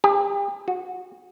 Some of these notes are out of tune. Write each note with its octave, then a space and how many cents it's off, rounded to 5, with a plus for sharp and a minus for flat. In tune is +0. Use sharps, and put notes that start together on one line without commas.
G4 +40
F#4 -20